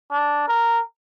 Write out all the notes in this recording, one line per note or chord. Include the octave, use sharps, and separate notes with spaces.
D4
A#4